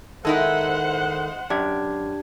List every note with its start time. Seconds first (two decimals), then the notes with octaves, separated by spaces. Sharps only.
0.25 D#3 G#3 D#4 E4 A4 C5 F#5
1.50 F#2 D4 G4 G#6